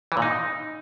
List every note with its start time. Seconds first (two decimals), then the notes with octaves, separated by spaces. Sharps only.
0.12 E3
0.17 A#2
0.22 D#4